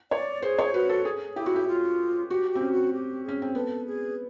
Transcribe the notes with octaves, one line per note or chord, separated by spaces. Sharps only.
C#5 D5
G#4 C5
C#5
F#4 B4
A4
G#4
E4 G4
F#4
G4
F4
F#4 G4
C4 G4
C#4
F#4
G4
C#4 G#4
C4
B3 A4
G#4